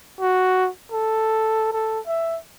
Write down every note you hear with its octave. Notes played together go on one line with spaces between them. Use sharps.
F#4
A4
A4
E5